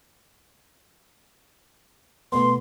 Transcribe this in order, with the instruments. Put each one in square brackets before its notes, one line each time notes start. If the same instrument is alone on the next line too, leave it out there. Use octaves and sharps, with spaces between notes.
[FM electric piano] B2 A3 B3 [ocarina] C6